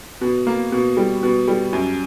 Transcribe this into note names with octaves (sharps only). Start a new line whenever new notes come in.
B2
A#3
B2
G3
B2
G3
F#2